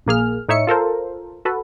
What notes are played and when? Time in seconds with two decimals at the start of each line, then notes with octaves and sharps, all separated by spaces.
0.06 A#1 A#3 G#4 F6
0.49 A2 D#4 C#5 E5 C#7
0.67 F4 A4 A#4 C5
1.45 F#4 A4 B4